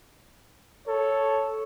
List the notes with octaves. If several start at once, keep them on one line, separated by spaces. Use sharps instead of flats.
A4 C#5